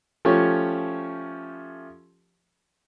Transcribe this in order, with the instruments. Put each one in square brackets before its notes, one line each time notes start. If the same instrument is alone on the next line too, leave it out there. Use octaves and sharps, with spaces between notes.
[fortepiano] F3 A3 C#4 G4 C#5